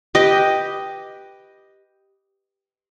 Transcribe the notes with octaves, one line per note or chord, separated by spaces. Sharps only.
G4 B4 D#5